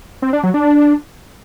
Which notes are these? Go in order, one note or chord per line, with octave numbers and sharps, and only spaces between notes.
C4
D4
F#3
D4